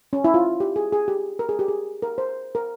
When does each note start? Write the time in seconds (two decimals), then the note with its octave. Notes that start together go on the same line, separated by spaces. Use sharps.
0.13 C#4
0.24 E4
0.34 F4
0.60 G4
0.76 G#4
0.93 G#4
1.08 G4
1.39 A#4
1.49 G#4
1.59 G4
1.68 G#4
2.02 A#4
2.18 C5
2.55 A#4